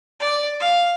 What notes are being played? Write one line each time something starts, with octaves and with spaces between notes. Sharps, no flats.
D5
F5